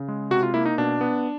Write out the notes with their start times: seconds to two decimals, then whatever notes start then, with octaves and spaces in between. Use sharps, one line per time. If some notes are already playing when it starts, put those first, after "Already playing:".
Already playing: C#3
0.08 G#3
0.31 C3 F#4
0.43 F4
0.54 A#3 E4
0.66 D#4
0.78 B2 D4
1.01 B3